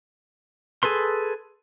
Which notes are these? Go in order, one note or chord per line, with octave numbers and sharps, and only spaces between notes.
G#4 A4 B4 C6